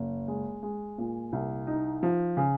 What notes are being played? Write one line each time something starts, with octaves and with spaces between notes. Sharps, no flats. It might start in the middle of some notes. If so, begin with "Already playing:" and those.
Already playing: F#1
G#3
G#3
A#2
C2
D#4
F3
C#3